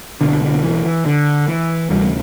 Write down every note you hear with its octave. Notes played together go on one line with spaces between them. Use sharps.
C2 B2 D3
D3
E3
E3
D3
E3
D2 C3 E3 G3